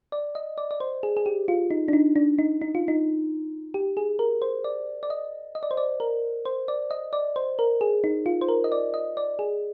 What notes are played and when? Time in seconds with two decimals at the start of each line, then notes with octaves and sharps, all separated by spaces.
0.12 D5
0.35 D#5
0.58 D5
0.71 D5
0.80 C5
1.03 G#4
1.17 G#4
1.26 G4
1.48 F4
1.71 D#4
1.88 D4
1.93 D#4
2.16 D4
2.39 D#4
2.62 D#4
2.75 F4
2.88 D#4
3.74 G4
3.97 G#4
4.19 A#4
4.42 C5
4.64 D5
5.03 D5
5.10 D#5
5.55 D#5
5.63 D5
5.71 C5
5.77 D5
6.00 A#4
6.45 C5
6.68 D5
6.91 D#5
7.13 D5
7.36 C5
7.59 A#4
7.81 G#4
8.04 D#4
8.26 F4
8.41 C5
8.48 A#4
8.64 D#5
8.72 D5
8.94 D#5
9.17 D5
9.39 G#4